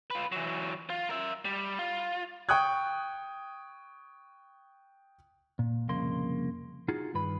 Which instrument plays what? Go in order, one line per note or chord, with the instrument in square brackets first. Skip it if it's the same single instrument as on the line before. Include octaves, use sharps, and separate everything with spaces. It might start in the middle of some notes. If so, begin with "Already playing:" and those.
[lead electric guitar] F4 B4
E3 F#3
F4
A#4 E5
G3
F4
[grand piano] G5 C#6 D#6 F#6 G#6
[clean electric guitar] A#2
C2 F2 C#3 A#3 C6
D#4 F4 F#4 G#4
G2 D#3 B4 B5